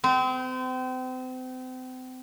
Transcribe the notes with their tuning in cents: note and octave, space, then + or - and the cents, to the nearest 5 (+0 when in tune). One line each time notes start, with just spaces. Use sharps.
C4 -35